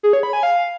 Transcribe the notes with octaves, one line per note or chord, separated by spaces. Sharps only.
G#4
C#5
B5
G#5
F5